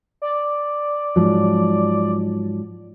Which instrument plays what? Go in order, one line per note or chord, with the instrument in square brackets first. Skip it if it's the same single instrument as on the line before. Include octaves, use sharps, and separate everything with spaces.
[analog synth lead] D5
[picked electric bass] G#2 F3 F#3